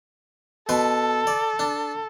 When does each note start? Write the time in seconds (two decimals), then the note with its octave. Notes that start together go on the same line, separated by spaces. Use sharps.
0.69 B2 A4 B4 C6
1.27 D5
1.59 D4